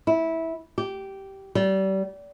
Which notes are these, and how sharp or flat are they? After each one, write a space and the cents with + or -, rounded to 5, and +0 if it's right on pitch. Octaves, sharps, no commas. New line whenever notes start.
E4 -15
G4 -15
G3 -30